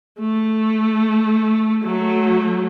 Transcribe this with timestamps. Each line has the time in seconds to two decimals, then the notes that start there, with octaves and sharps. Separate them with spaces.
0.20 A3
1.84 F#3 A3